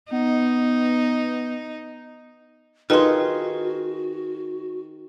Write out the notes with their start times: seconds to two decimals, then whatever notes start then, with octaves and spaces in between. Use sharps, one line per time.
0.12 B3 D#4
2.90 D#3 F4 F#4 G#4 A4 B4 D#5 C6